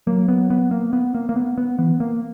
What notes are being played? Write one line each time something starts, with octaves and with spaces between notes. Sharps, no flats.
F#3 A#3
B3
B3
A#3
B3
A#3
A#3
B3
B3
E3 B3
A#3